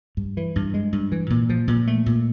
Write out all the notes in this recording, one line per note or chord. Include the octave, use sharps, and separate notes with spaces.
G2
E3
G2
G#3
G2
E3
A#2
F3
A#2
A3
A#2